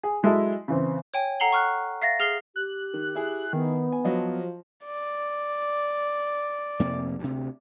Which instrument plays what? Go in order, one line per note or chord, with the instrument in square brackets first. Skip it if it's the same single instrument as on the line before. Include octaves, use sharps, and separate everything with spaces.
[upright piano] G#4
F#3 G#3 E4 A4 D#5 E5
C#3 E3 C4
[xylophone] C#5 G5 G#5
A4 F#5 A#5 C7 F#7 G7
C#6 F6 F#6
E5 F5 A6 A#6
G#4 F6 C7 G7
[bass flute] G4 [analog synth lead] F#6
[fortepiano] D#3
E4 G#4
[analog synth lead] D#3 [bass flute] B3
[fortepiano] G#5
[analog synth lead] F3 [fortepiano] F#3 D#5
[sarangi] D5
[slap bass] F2 C3 A#3
D2 C3